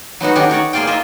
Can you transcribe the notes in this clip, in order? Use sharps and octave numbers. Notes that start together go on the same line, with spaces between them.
F#3 B3 D#4 F#4
D3 D#3 C#4 D4 F#4 G4
D#4 F#4 C#5 D5
A#3 G#4 C5 D5 F5 G5
A#3 F4 C5 D#5 E5